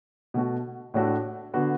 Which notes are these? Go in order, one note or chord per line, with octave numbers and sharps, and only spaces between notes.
B2 A3 F#4
A2 A3 D4 F#4 A4
D3 B3 F#4